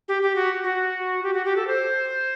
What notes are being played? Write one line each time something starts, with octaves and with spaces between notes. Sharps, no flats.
G4
G4
F#4
F#4
G4
F#4
G4
A4
C5